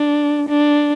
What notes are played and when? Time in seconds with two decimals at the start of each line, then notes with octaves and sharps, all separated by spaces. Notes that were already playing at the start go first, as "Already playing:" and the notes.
Already playing: D4
0.49 D4